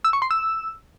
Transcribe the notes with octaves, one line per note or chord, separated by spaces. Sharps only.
E6
C#6
C6
E6